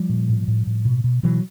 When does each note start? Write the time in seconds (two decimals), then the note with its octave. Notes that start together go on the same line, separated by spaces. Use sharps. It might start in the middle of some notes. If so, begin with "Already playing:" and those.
Already playing: F3 G3
0.09 A#2
0.29 A2
0.48 A2
0.67 A2
0.85 B2
1.04 B2
1.23 B2 E3 F#3